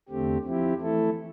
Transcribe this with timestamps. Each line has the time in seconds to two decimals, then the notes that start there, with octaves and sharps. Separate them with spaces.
0.09 E2 D3 A3 C4 G4
0.45 F3 C4 E4 G4
0.80 E3 A3 E4 A4